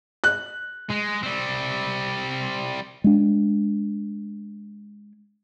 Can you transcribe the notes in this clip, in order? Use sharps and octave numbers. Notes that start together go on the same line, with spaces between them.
F#6
G#3
G3 C4
G#3 D4